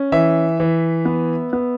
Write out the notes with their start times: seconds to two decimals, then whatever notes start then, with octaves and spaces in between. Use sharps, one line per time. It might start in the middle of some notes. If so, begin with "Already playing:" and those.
Already playing: C#4
0.12 E3 E5
0.60 E3
1.05 B3
1.53 B3